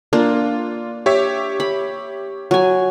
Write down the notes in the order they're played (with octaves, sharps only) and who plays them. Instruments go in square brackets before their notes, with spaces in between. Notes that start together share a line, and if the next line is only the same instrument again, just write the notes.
[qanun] A#3 D4 [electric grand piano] F4
[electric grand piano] G4 C#5 E5
[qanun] B5
F#3 G#5